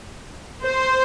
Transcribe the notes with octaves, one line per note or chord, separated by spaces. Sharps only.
C5